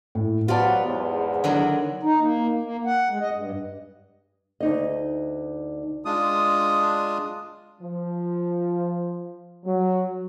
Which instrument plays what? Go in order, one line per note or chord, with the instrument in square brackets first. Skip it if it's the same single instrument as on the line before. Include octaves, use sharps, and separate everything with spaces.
[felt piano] A2
[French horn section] F#3 B3 [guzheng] F4 D5 [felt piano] G4 C5 A5
[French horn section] E2 G#2
[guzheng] D3 D#3 F#3
[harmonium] D#4
A#3
A#3
F#5
G#3
D#5
G2
[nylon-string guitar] D2 D#4 D#5
[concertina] G#3 D4 F4 D#6
[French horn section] F3
F#3